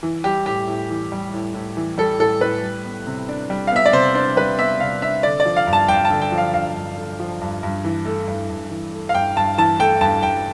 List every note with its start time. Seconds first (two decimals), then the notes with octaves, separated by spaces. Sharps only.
0.03 E3
0.24 G3 G4
0.46 A2 G4
0.67 A2
0.90 E3
1.12 G3
1.34 A2
1.54 A2
1.77 E3
1.98 G3 A4
2.20 A2 A4
2.41 A2 B4
2.63 G3
2.85 B3
3.07 C3
3.29 D4
3.50 G3
3.67 F5
3.72 B3 E5
3.86 D5
3.93 C3 C5
4.15 D4 C5
4.37 G3 B4
4.58 B3 E5
4.80 C3 F5
5.02 D4 E5
5.23 D3 D5
5.40 D5
5.46 F3
5.56 F5
5.67 G2
5.73 A5
5.88 G2 G5
6.05 A5
6.10 D3
6.22 G5
6.32 F3
6.38 F5
6.53 G2 F5
6.76 G2
6.97 D3
7.20 F3
7.41 G2
7.63 G2
7.85 E3
8.05 A3
8.27 G2
8.50 G2
8.70 E3
8.93 A3
9.09 F5
9.14 G2 G5
9.36 G2 A5
9.58 E3 A5
9.79 A3 G5
10.01 G2 A5
10.23 G2 G5